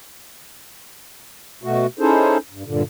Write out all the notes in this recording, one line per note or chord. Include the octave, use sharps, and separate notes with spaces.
B2 A3 F#4
C#4 D#4 E4 G#4 A4 C5
G2
G2 A#2 D3